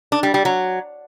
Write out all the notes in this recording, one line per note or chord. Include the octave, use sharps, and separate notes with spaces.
D4
G3
G3
F#3